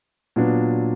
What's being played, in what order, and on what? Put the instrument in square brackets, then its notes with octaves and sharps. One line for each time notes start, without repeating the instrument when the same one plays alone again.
[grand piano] A#2 F#3 B3 D4